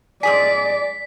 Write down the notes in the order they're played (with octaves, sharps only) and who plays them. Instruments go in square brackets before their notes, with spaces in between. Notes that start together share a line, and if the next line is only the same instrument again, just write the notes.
[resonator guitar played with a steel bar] G#2 G#4 G#5 [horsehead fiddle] D5 [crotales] B6